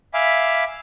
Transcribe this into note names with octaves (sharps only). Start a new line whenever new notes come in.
E5 F5 G#5 B5 D6